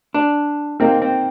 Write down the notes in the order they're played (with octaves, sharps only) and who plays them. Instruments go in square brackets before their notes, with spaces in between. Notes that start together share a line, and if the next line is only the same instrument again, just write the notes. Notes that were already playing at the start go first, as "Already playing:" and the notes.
[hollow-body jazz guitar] D4
[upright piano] A#3 D#4 A#4 [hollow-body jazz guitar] C4
[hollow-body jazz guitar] C4